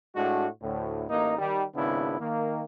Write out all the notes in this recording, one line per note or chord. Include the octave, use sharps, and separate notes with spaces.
A2 G#3 D4 F#4
D2 A2
A1 A#3 D#4
D#3 G3
G#1 C#3 B3 D4 E4
D#3 A#3